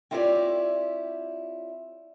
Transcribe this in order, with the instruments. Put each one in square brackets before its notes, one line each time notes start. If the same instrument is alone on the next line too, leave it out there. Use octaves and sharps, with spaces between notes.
[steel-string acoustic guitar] C4 E4 F4 G4 C#5 D5